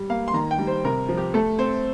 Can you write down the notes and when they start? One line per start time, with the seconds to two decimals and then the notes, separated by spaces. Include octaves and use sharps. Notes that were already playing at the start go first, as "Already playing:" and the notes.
Already playing: G3
0.10 A#3 F5
0.28 C6
0.34 D#3 A#5
0.51 G5
0.59 G3
0.67 C5
0.84 C3 A#4
1.09 F3
1.17 G4
1.34 A3 A4
1.58 C4 C5